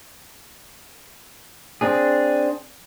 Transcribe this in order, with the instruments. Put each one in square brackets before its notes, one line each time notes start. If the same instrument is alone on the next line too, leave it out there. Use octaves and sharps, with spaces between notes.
[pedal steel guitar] C4 D4 G#4